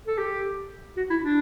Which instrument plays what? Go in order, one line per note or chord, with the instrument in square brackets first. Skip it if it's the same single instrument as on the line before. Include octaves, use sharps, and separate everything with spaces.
[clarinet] A4
G4
F#4
E4
D4